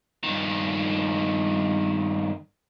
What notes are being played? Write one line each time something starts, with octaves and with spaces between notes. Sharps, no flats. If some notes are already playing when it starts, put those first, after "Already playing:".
G2 D#3